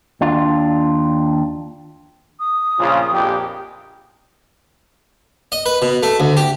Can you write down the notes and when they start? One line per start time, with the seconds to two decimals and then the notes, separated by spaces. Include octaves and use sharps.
0.21 D#2 D4 F4
2.40 D#6
2.80 A#1 C#3 F4
3.12 A#1 F2 G4
5.52 D#5
5.66 B4
5.82 B2
6.03 A3
6.20 D2
6.37 G4